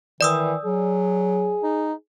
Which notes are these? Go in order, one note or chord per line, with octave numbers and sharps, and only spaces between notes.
D#3 E3 D5 D#6 E6
F#3 G#4
D#4